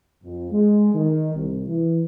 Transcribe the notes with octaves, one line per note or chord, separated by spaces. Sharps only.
F2
G#3
D#3
C2
E3